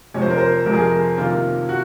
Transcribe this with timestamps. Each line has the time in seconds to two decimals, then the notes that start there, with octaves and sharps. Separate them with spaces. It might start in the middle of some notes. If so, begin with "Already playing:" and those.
0.14 F2 C3 F3 G#3 C#5
0.22 C5
0.30 A#4
0.38 C5
0.66 F2 C3 F3 G#3 A#4
0.73 G#4
0.81 A#4
1.17 C3 D#3 A#3 F4
1.69 F#4